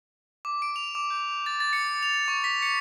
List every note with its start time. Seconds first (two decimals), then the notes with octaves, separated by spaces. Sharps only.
0.45 D6
0.62 D7
0.76 F7
0.95 D6
1.10 G6
1.46 A6
1.60 A6
1.73 C#7
2.03 F7
2.28 C#6
2.44 B6
2.62 C#7